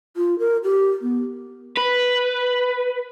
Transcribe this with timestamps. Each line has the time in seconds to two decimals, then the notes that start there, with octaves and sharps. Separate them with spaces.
0.17 F4
0.39 A#4
0.64 G4
1.02 B3
1.77 B4